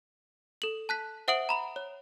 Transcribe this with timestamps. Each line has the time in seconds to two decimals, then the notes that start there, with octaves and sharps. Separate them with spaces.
0.62 A4 F#7
0.89 A5 F#6 B6
1.28 C5 E5 F#5 D#6 D7 F#7
1.49 A#5 B5 F7
1.76 C#5